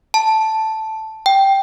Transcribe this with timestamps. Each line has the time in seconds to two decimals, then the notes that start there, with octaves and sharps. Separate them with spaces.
0.14 A5
1.26 G5